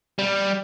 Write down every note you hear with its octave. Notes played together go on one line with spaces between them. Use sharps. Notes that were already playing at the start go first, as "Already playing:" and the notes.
G3